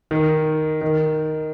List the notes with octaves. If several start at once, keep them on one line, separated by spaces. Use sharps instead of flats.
D#3
D#3